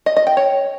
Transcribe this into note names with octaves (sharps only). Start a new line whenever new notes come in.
D#5
D#5
G5
C#5